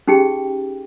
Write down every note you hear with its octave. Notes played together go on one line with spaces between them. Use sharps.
C#4 D#4 G4 G#4 G5